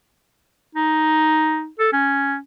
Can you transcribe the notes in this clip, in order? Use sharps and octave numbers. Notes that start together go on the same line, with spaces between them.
D#4
A4
C#4